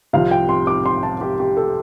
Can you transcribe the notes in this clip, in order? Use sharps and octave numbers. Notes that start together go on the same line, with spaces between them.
C2 C3 F3 F5
G5
C6
D6
C6
A5
G4
G4
A4